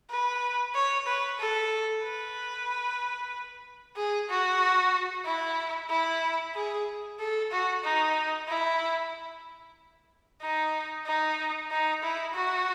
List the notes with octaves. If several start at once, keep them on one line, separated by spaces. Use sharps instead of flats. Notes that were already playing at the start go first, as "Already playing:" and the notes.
B4
C#5
B4
A4
B4
G#4
F#4
E4
E4
G#4
A4
F#4
D#4
E4
D#4
D#4
D#4
E4
F#4